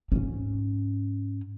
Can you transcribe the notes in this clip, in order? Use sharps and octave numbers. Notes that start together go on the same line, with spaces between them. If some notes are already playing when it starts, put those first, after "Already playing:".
G#2 C#4